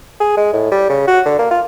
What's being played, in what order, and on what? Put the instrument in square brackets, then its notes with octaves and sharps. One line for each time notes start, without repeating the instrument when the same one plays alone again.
[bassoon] G#4
G#3
A2
G3
C#3
F#4
D3
A#3
F4